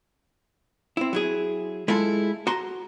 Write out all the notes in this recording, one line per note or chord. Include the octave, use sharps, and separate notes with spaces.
C4 E4
F#3 E4 G#4
G#3 E4 F4 G#4 A4
F#4 A#5 C6